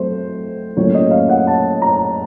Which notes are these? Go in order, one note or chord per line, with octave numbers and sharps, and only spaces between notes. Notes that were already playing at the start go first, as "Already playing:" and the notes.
Already playing: F#3 A3 C4 C5
A2 F#3 A#3 C#4 C#5
D#5
F5
F#5
A5
A#5